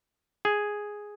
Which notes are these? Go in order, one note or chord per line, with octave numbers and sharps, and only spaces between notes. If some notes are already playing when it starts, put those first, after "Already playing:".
G#4